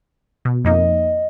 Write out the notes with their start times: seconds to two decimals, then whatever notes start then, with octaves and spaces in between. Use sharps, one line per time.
0.45 B2
0.65 F2 A#3 D#4 D#5